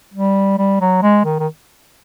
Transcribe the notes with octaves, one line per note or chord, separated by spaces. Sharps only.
G3
G3
F#3
G#3
D#3
D#3